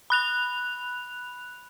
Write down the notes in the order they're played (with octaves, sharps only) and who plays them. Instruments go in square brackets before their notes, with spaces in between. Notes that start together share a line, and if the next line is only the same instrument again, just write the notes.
[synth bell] B5 F#6 F7